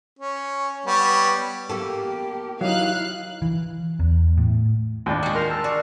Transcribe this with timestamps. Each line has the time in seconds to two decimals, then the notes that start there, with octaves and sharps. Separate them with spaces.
0.19 C#4
0.86 G3 B3 C#5
1.69 A#3 B3 G4 A4
2.61 F#3 D#4 E4 F5 F#6
3.42 E3
4.00 E2
4.38 A2
5.06 D#2 D4 F4 D6
5.23 G#3 F#4
5.35 A#4 C6 G6 C7
5.50 A5 E6
5.64 F#4 D5